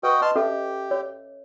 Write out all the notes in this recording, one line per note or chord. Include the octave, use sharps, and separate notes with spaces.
F#4 B4 D#5 G5
D#5 A5 C6 F6
C#4 G4 A4 E5
C#5